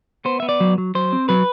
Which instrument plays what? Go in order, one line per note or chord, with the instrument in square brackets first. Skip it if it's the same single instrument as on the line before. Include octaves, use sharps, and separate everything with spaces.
[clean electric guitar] B3 C5
B3 E5
D5
F#3
F#3
F#3 C5
C4
F#3 B4